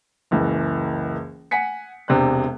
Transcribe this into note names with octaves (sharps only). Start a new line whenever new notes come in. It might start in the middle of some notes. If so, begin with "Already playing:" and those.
F#1 C#2 E3
F#5 G#5 B6 C#7
E1 C3 D4 C5 F#6